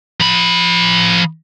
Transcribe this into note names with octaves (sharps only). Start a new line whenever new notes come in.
F3 B5